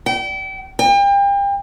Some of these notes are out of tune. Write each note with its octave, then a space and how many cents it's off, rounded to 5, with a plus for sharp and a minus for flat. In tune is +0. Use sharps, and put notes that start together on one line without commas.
G5 -35
G5 +35